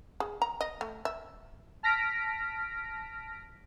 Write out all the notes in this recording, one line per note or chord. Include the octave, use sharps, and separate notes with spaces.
G#4
A#5
D#5
A3
E5
A5 F6 A#6 B6 D7